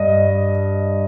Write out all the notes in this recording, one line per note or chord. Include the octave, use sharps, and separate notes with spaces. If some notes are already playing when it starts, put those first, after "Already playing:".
Already playing: G2 D#5